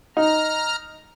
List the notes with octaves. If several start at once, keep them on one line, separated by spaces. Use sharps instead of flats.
D#4 A#5 F6